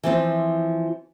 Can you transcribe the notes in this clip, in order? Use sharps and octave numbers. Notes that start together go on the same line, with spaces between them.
E3 F3 C4